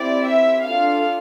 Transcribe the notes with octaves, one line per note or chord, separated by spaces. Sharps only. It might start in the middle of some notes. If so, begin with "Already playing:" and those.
Already playing: C4 E4 G4 D5
E5
D4 F4 A4 F5